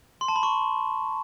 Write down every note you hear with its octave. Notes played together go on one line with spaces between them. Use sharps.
C6
A5
B5
C#6